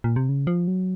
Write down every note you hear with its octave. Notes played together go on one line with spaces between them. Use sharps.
A#2
C3
C#3
F3
F#3